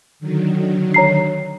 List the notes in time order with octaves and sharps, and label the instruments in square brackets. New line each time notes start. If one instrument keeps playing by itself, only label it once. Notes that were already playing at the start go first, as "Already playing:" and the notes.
[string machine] D3 D#3 F#3
[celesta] C#5 A#5 C7